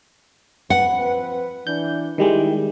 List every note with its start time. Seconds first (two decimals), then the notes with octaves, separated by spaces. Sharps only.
0.70 F3 C4 B4 F#5
1.67 E3 D4 G6
2.18 D#3 G3 G#3 E4 G4